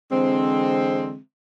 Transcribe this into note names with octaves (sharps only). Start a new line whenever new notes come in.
D3 E3 G#3 C4